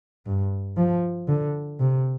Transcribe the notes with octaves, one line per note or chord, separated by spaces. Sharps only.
G2
F3
D3
C3